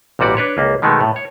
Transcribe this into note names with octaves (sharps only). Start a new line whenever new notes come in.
A1 A#2 G3 F#4 D5
D4 B4 C#5
C#2 A#3
B2 D#3 G#3 A3 B3
A2
C#5